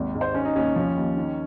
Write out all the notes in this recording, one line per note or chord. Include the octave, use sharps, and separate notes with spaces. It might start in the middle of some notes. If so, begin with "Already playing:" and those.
Already playing: G#1 D#2
G#2
C5
D#3 C#4
D#4
D#2 C#4
F3 C#4
D#2
D#3